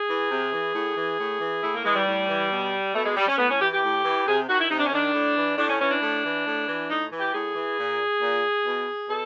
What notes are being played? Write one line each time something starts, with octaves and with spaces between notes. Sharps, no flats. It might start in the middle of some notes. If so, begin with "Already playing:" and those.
Already playing: G#4
E3
C3
E3
A2
E3
A2
E3
A2 E4
A#3
E3 G#3
G3
A2
E3
B2
B2 A3
G#3
G3
C#4
A2 B3
C#4
E3 G4
G4
A2
E3
C3 G#4
D#3 F#4
E4
C3 D#4
D4
C#4
D#3 D4
A2
E3
A2 D4
C#4
E3 C#4
D4
A2
E3
A2
E3
A2 D#4
E3
G4
A2 G#4
E3
A#2
A#2
B2
B2 A4